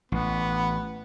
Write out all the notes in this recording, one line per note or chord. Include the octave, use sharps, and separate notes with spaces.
A1 B3